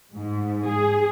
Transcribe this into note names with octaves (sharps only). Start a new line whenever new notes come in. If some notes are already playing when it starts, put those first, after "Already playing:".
G#2
G#4